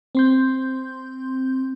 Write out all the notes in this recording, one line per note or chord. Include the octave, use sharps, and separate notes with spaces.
C4 C6 G6